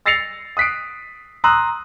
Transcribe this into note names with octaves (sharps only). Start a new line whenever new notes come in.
E6 A6 A#6 C7 C#7 F7
D#6 F#6 B6 C7 D7
A#5 C6 D#6 E6 F#6